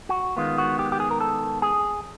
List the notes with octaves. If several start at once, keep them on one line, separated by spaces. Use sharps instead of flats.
F#4
D#3 G#3 B3 F4
F#4
G4
G4
G#4
A#4
A4
G#4